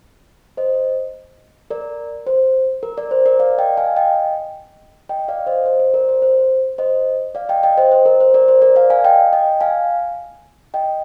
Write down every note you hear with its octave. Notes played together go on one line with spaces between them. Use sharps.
C5 D#5
A#4 D5
C5
A#4
A#4 D5
C5
A#4 D5
D5 F5
D#5 G5
F5 G#5
D#5 G5
D#5 G5
D5 F5
C5 D#5
C5
C5
A#4 D5
C5
C5
C5 D#5
D5 F5
D#5 G5
D#5 G5
C5 D#5
C5
A#4
C5
A#4 D5
C5
A#4 D5
D5 F5
F5 G#5
D#5 G5
D#5 G5
F5 G#5
D#5 G5